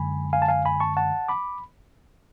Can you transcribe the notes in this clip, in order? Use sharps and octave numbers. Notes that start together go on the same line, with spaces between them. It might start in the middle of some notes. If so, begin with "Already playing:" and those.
Already playing: F#2 D3 G#3 G#5 B5
F5 G#5
A5
F5 G#5
G#5 B5
A5 C#6
F#5 A5
B5 D6